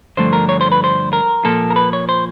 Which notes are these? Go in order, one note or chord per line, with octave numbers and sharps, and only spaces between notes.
G2 D3 F3 A3 C5
A#4
C#5
C5
B4
C5
A#4
A#2 F3 A#3 A4
A#4
B4
C#5
C5